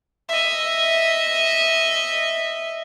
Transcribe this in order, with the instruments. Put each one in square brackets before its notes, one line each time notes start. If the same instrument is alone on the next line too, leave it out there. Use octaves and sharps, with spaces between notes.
[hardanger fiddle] D#5 E5